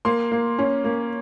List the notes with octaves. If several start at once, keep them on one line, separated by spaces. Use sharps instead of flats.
A#3 C6
A#3
C#4
A#3